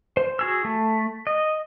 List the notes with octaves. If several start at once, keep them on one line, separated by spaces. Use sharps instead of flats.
C5
F#4 G#4 E6
A3
D#5